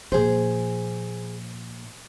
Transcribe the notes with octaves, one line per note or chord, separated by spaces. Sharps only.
A#2 F3 G#4 C5